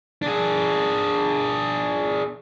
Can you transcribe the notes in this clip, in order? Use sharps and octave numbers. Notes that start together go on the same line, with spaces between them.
D4 G#4